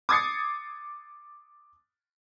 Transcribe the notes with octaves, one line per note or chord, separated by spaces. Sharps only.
D6 D#6 G#6 A6 C7 C#7